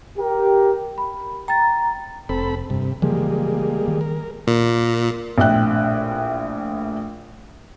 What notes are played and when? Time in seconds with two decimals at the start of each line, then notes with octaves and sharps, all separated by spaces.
0.18 G4 A#4
0.98 B5
1.48 G5 A#5 A6
2.29 F1 C4 A4 B5
2.70 G2 C3
3.02 C#3 E3 F3 G3 G#3 A#3
3.88 D#3
4.01 A#4
4.47 A#2
5.38 A#1 A2 E5 G5 F#6